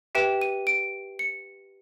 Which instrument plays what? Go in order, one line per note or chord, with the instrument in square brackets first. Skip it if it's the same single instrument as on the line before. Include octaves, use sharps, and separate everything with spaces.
[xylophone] G4 B4 E5 G5 E7
D#7
D7
C#7